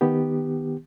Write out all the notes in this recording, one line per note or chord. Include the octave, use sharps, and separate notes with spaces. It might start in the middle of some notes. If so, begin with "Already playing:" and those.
D#3 B3 G4